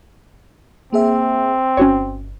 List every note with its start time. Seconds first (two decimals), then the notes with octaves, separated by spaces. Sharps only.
0.93 A#3 C4 G#4 E5
1.77 G1 C#4 F#4 C#5